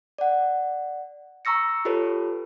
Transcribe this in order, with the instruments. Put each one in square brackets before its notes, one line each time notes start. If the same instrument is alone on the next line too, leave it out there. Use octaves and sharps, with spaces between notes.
[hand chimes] D5 F#5
A#5 C#6 E6 A#6 C#7
F4 G4 A4 B4 C#5